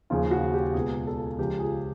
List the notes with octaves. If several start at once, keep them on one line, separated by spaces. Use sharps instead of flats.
D#2 C#3 F3 F4
F#4
G4
C#2 B2 G#4
A4
C#2 C#3 F3 G4
G#4